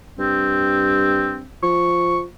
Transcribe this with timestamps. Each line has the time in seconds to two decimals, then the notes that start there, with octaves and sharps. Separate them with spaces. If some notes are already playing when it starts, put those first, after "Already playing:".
0.19 G2 C4
1.63 F3 C#6